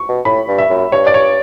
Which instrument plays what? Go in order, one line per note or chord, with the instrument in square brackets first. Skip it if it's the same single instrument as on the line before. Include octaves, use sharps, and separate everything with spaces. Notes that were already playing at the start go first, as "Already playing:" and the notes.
Already playing: [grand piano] C#6
[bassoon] B2
[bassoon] A2 [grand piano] B5
[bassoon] G2
[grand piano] E5
[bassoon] F#2
[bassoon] G2 [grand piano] C#5
[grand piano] D5
C#5